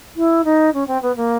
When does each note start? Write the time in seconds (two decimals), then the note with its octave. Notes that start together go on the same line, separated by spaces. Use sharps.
0.16 E4
0.45 D#4
0.74 C#4
0.88 C4
1.02 B3
1.16 A#3